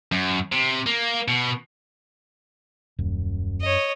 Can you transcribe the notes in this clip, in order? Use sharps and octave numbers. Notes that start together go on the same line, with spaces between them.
F#2
C3
A#3
B2
D#1 F#2
C#5 D#5